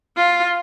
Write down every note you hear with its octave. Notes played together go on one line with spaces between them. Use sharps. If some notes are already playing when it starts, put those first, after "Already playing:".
F4